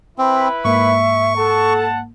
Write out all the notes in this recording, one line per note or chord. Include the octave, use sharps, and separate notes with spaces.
C4 E4 B4 B5
G#2 A#3 E5 C#6
A4 F#5 A5